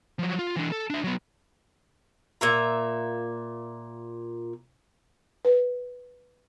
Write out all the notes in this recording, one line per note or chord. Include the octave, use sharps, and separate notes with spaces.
F3 F#3
F4
E3 D4
A4
D4 E5
F#3 B3
A#2 E5 A#5
B4